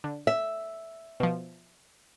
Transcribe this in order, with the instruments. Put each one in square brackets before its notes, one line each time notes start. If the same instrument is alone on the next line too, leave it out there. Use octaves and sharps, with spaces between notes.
[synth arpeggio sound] D3
[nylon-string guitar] E5
[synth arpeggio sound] B2 F3